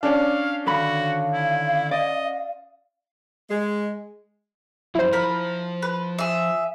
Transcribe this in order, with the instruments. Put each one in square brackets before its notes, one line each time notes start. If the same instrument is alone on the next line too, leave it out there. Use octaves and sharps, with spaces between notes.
[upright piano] C#4 D4 [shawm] F5
[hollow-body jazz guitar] D3 D#3 B5 [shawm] F#4 [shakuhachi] F5
[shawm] E4
[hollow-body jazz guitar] D5 [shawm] D#5
[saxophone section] G#3
[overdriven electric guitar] F#2 F3 [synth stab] E4 C5
[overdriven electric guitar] F3 [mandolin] A#4 B5
[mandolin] B4
G#4 E5